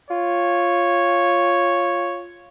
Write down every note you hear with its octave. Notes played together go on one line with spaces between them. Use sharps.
F4 C#5